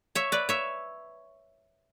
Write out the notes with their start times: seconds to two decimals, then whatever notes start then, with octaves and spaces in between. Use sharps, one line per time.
0.15 C#5 E5
0.32 B4 D5
0.49 C#5 E5